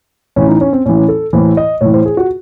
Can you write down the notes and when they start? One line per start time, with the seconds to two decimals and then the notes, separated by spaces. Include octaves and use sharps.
0.36 A2 E3 C#4
0.48 D#4
0.61 C#4
0.73 C4
0.86 A2 E3 C#4
1.08 A4
1.33 A2 E3 C5
1.57 D#5
1.81 A2 E3 C#5
1.94 C5
2.05 G#4
2.17 F#4